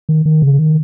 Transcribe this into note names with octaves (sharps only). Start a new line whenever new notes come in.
D#3
D#3
C#3
D#3